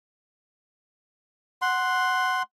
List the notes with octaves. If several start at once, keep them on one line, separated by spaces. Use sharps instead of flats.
F#5 C6